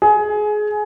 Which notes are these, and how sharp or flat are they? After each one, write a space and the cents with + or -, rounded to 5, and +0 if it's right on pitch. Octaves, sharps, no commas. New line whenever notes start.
G#4 +20